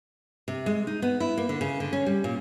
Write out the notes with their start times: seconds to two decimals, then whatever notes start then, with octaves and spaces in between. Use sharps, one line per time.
0.48 C3
0.66 G#3
0.87 D#4
1.02 B3
1.20 E4
1.37 A#3
1.49 D3
1.61 C#3
1.80 D3
1.93 C#4
2.06 G3
2.24 A#2